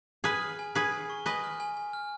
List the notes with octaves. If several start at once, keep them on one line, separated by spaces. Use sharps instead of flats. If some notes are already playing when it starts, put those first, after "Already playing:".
G#4 B4 F6
F6
G#5
G#4 B4 G#5
G#5
C#6
B4 D#5 G#5
F6
G#5
G#5
F6